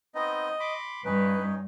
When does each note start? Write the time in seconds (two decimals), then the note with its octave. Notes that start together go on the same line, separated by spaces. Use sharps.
0.15 B3 C4 D#4 D#5
0.60 B5 C6 D6
1.05 G2 C#4 D#4 B4